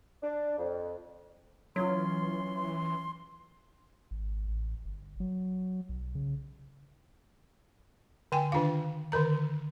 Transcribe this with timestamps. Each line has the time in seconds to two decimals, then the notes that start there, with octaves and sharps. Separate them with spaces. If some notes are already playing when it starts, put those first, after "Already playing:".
0.22 D4
0.58 F2
1.76 E3 F#3 C#4 F4 C6
4.11 G#1
4.48 A1
4.85 G1
5.20 F#3
5.89 B1
6.15 C#3
8.32 D3 G5 G#5
8.52 D#3 D4 F4 F5
9.12 D3 D#3 A#4 A#5